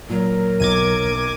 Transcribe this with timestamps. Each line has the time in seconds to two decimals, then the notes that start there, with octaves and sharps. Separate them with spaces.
0.09 A#2 F#3 A#4
0.60 B1 D6 G#6 D#7